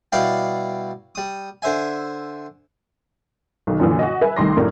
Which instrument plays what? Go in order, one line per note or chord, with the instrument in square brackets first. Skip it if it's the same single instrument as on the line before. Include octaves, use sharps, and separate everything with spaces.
[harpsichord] B2 G3 E4 D5 F5 G5
G3 D#6
D3 C5 E5 G#5
[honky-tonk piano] B1 D#3
F#2 A#2 D3 E3
F#4 D#5
B4 E5 G#5
C2 D#3 A3 C6 D6 A#6
F#2 A2 A3 A#3 D4